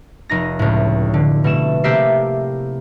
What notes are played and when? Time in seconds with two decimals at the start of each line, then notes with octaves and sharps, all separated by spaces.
0.29 F1 D#4 A#6
0.59 C#2 A2
1.14 D3
1.44 B2 A3 E7
1.84 C3 A3 A#3 G4 E5 C7